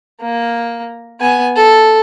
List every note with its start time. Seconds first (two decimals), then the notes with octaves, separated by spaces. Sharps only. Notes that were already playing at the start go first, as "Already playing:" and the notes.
0.21 A#3
1.20 B3 G#5
1.56 A4